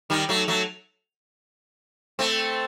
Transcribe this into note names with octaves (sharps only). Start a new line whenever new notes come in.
D#3 G3
F#3 A3
F#3 A3
A3 C4